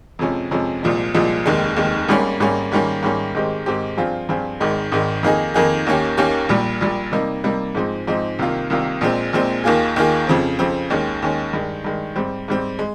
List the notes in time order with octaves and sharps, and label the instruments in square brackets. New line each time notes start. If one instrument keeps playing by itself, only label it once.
[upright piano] F2 C3 F3 G#3 C#4
F2 C3 F3 G#3 C#4
C2 A#2 F3 G#3
C2 A#2 F3 G#3
F1 D#2 D#3 G#3
F1 D#2 D#3 G#3
G#1 G#2 G3 A#3 C#4
G#1 G#2 G3 A#3 C#4
G#2 D#3 G3 A#3 C#4
G#2 D#3 G3 A#3 C#4
G#2 D#3 G#3 C4 G4
G#2 D#3 G#3 C4 G4
G2 F3 C4 F4 G#4
G2 F3 C4 F4 G#4
G#1 G#2 D#3 G#3
G#1 G#2 D#3 G#3
F2 D#3 A#3 D#4 G#4
F2 D#3 A#3 D#4 G#4
D#2 D#3 A#3 C#4 G4
D#2 D#3 A#3 C#4 G4
A#1 A#2 G3
A#1 A#2 G3
C3 G3 A#3 D#4
C3 G3 A#3 D#4
G#2 F3 G#3 C4 D#4
G#2 F3 G#3 C4 D#4
C2 C3 D#3 A#3 F4
C2 C3 D#3 A#3 F4
A#1 A#2 G#3 C4
A#1 A#2 G#3 C4
D#2 D#3 A#3 F4 G#4
D#2 D#3 A#3 F4 G#4
F2 C#3 F3 C4
F2 C#3 F3 C4
D#2 D#3 G#3 C#4
D#2 D#3 G#3 C#4
G2 D#3 G#3
G2 D#3 G#3
G#2 G3 C4
G#2 G3 C4
G#3